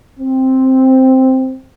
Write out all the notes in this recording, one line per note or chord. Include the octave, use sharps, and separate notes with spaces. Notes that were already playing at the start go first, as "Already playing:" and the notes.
C4